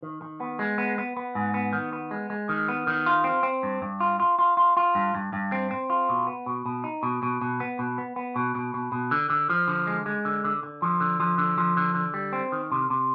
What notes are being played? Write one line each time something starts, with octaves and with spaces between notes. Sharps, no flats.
D#3
D#3
B3
G#3
B3
B3
B3
G#2
B3
D#3
B3
G#3
G#3
D#3
B3
D#3
F4
C4
C4
G2
G2
F4
F4
F4
F4
F4
G2
G2
G2
C4
C4
F4
B2
B3
B2
B2
D#4
B2
B2
B2
B3
B2
B3
B3
B2
B2
B2
B2
D3
D3
F3
D3
G#3
G#3
D3
D3
D3
F3
D3
F3
D3
F3
D3
D3
G3
C4
D#3
C3
C3